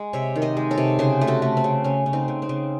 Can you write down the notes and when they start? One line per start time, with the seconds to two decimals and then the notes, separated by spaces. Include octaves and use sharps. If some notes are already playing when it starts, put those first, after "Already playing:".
Already playing: G#3 G#4
0.13 C3 C#5 E5
0.35 D#3
0.42 C5 D#5
0.57 G#3
0.71 A4 C#5
0.78 C3
0.99 C#3 G#4 C5
1.21 A3
1.27 F#4 A4
1.42 A3
1.57 C4
1.64 C#3
1.84 C#3 C#4
2.06 C#3
2.13 C4 D#4
2.28 C#3
2.42 C4
2.49 C#3